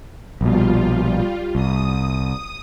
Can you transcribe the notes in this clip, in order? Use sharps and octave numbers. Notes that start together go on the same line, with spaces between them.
A#1 B2 G3 F4
C2 D#6